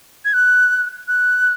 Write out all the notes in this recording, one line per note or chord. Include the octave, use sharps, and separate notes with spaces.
G#6
F#6
F#6